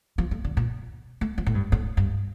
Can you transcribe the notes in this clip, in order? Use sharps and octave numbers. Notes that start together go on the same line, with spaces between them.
F3
A3
D3
A#2
A3
F3
A2
G2
A2
G2